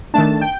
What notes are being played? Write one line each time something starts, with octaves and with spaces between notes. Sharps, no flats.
D#3 A3 D4 A5
G5